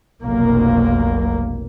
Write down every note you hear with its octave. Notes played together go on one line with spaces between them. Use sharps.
F1 B1 A#3